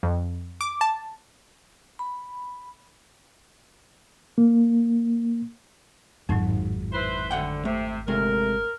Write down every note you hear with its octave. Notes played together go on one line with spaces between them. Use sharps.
F2
D6
A5
B5
A#3
G#1 F2 A2 F#3 D#4
E4 B4 C5
D2 D3 F#5 G5
C3 A3
C3 G#3 A3 A#4